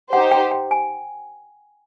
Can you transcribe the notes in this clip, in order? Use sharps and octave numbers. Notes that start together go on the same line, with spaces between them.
D#4 G4 C5 F#5
G5
G5
G#5